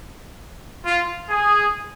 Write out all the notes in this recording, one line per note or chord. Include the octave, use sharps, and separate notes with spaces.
F4
G#4